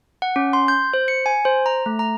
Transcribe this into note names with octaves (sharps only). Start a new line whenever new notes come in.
F#5
C#4
C6
G6
C5
C#7
G#5
C5
A#5
A3
A#5